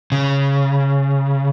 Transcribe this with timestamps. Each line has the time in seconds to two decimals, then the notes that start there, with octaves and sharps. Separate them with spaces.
0.12 C#3